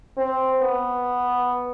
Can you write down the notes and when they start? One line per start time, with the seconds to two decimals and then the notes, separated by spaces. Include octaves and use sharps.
0.17 C4
0.61 B3